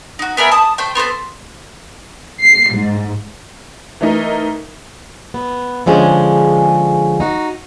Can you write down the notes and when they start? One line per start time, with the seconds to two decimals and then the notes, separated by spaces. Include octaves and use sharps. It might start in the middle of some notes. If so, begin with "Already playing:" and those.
0.19 D#4 F#4
0.37 B3 G#4 A#4 E5
0.51 A5 D#6
0.78 A3 C5 G5
0.95 B3 C4 A4 C5
2.41 C7
2.72 G#2
4.01 E3 A3 D#4 A#4
5.34 B3
5.86 D3 F3 G#3 C#4 G#4
7.20 D#4 F#4